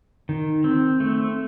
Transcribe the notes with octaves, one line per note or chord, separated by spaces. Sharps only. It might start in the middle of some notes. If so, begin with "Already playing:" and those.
D#3
C4
A3